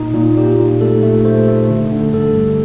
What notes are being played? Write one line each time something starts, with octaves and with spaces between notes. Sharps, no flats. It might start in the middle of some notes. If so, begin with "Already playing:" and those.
Already playing: A#2 D#4
A#2
A#2 G4
A#2
A3 A4
A3
A3 C5
A3
D3
D3
G2 A4
G2